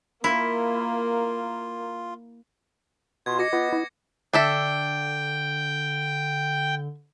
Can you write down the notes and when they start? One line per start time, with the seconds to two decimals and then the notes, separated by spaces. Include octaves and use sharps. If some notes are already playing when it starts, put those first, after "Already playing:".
0.24 A#3 E4 F4 A#4
3.26 B2 F4 C6 G#6
3.39 F#4 D#5 D6 A#6 C#7
3.53 B3 F4
3.73 E4
4.33 D3 D4 A4 E5 G5